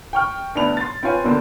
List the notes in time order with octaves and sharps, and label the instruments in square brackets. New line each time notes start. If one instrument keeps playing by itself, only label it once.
[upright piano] G5 C#6 F6
D2 G2 B3 D4 A5 F7
C6 A6
C4 F4 B4 C#5 F5 G#5
G2 B2 D3 A#3 C4